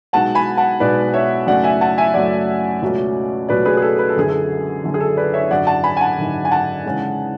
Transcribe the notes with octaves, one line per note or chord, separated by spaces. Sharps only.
B1 B2 G#3 B3 F#5 A5
G#5 B5
F#5 A5
B1 B2 G#3 B3 B4 D5
C#5 E5
F#2 C#3 F#3 A3 D5 F#5
E5 G#5
F#5 A5
E5 G#5
F#2 C#3 F#3 A3 D5 F#5
C#2 B2 F#3 A3 C#4
C#2 B2 F#3 A3 C#4 B4 D5
G#4 B4
G#4
A4
B4
A4
F#1 F#2 D3 G#4
A4
F#1 F#2 D3
G#4
A4
B4 D5
C#5 E5
G#1 F#2 D3 D5 F#5
F#5 A5
G#5 B5
G#5
F#5 A5
G#1 F#2 D3
G#5
F#5 A5
E2 C#3 G#3